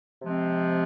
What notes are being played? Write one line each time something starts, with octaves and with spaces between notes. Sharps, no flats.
C3 F3 G#3 C4